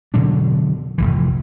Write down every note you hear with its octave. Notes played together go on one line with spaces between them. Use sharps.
B2 D3 F#3 D4
F1 C2 E3